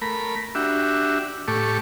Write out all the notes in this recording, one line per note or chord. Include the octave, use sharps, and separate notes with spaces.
A3 A#4 B5
D4 F#4 G4 E5
A2 A3 G4 A4 C#6 D6